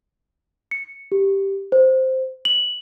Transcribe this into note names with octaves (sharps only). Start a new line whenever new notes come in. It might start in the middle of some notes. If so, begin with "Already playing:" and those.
C#7
G4
C5
F#7